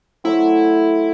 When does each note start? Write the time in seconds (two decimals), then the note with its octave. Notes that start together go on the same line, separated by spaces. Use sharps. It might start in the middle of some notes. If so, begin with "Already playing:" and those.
0.24 F#3 A3 C4 E4